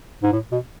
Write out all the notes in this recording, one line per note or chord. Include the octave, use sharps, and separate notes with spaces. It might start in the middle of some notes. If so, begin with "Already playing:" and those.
G#2
A2
B2